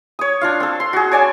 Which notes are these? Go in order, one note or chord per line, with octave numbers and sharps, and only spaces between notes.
C#5 D#6
D4 F4 F5
C4 A4
C6
F#4 G#4
C#5 D5 G#5 A5